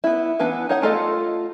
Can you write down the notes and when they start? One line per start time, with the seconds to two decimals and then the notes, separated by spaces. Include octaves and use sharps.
0.04 B3 E4
0.39 E3 B3 D4 B4 F#5
0.69 D#4 C#5 F#5
0.82 A3 F4 A4 D#5